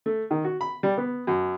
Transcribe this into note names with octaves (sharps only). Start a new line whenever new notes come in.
A3
D#3
F#4
B5
G3
B3
F#2